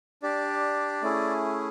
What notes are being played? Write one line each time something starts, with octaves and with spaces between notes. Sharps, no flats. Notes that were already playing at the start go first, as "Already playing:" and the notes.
D4 G4 D5
A3 C#4 E4 G#4